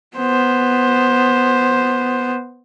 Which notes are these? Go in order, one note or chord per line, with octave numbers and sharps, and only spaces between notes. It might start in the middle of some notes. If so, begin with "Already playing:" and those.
B3 C5